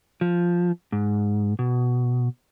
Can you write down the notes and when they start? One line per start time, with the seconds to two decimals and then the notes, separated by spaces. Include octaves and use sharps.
0.21 F3
0.92 G#2
1.59 B2